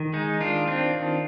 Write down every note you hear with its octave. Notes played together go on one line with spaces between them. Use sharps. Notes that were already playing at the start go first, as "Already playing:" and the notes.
Already playing: D#3
G#3 D#4
D#3 D4 F4
C4 D4 F4
D#3